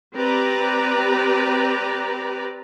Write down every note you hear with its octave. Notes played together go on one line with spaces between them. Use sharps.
C4 G4 B4 D5 A#5